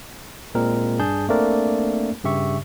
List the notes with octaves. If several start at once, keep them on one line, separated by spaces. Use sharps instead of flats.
A#2 G#3 C4 A#4
G2 D4 G#4 A5 G6
A3 A#3 C4 D4 A#4 D5
G2 C#3 G4 E5 C#6